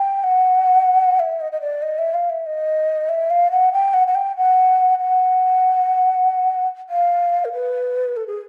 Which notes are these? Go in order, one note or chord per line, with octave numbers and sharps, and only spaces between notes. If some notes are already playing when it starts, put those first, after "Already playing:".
Already playing: G5
F#5
E5
D#5
D#5
D5
D#5
E5
F5
E5
D#5
E5
F5
F#5
G5
F#5
F#5
G5
F#5
F#5
F5
A#4
B4
A4
G#4